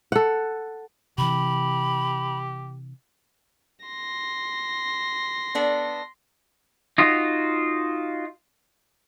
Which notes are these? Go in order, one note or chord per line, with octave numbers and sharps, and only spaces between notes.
A4 F#5
C3 E3 G4 B5
C6 A#6
B3 D4 A4
D#4 F4 F#4